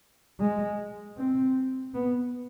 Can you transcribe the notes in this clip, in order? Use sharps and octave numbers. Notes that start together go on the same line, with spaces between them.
G#3
C4
B3